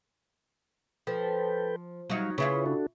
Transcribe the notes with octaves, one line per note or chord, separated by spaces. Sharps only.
F3 A4 B4 G5
F#3 G3 D#4 F5
C#3 E4 F4 G#4 B4 C#5
D4 F#4 A4